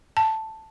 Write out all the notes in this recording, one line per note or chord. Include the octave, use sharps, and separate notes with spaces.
A5